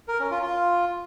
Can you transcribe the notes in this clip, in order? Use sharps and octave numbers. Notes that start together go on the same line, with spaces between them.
A#4
C#4
F4
F4